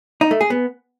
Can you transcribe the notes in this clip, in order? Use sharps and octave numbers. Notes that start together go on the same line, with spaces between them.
D#4
A3
G#4
B3